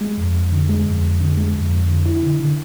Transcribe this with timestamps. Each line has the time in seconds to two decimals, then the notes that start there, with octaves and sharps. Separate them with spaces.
0.01 G#3
0.18 F2
0.35 F2
0.52 D3
0.69 G#3
0.86 F2
1.03 F2
1.20 D3
1.37 G#3
1.55 F2
1.72 F2
1.89 D3
2.06 E4
2.23 D3
2.40 D3